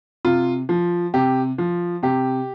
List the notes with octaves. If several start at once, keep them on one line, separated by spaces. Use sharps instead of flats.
C3 F4
F3
C3 G4
F3
C3 G4